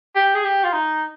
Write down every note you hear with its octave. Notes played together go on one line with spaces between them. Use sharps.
G4
G#4
G4
F4
D#4